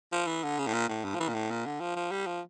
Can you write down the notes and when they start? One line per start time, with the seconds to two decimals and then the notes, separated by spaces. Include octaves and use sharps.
0.12 F3
0.27 E3
0.43 D3
0.59 C#3
0.67 A2
0.74 A#2
0.89 A2
1.04 G2
1.15 F3
1.20 E3
1.28 A#2
1.34 A2
1.50 A#2
1.66 D3
1.81 F3
1.96 F3
2.11 G3
2.27 F3